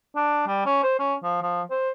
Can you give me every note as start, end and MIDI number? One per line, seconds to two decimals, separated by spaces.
0.16 0.46 62
0.47 0.63 55
0.66 0.80 61
0.83 0.98 72
0.99 1.14 61
1.23 1.38 53
1.42 1.62 53
1.70 1.91 72